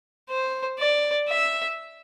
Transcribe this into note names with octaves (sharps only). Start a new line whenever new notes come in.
C5
D5
E5